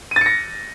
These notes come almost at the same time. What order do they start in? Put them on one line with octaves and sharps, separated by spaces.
D#7 A6 C#7 A#6